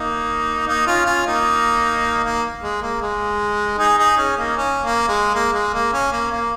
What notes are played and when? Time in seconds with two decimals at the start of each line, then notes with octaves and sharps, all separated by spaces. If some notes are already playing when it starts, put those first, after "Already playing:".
Already playing: A#3 D#4
0.68 A#3 D#4
0.87 C#4 F4
1.06 C#4 F4
1.26 A#3 D#4
2.24 A#3
2.63 G#3
2.82 A#3
3.02 G#3
3.78 D#4 G#4
3.98 D#4 G#4
4.17 C#4
4.36 A#3 D#4
4.57 C#4
4.82 A#3
5.08 G#3
5.35 A#3
5.53 G#3
5.73 A#3
5.93 C#4
6.12 A#3
6.31 A#3